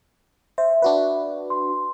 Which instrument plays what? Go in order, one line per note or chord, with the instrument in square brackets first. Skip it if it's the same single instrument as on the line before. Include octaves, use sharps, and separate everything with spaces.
[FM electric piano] C5 [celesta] E5
[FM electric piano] D4 F#4 B4
[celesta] C6